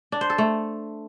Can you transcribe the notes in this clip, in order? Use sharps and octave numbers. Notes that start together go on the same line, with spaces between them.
D4
C5
A4
A3